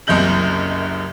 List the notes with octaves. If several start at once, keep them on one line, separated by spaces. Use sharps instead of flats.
F#1 C2 F#2 D#5 G6 F#7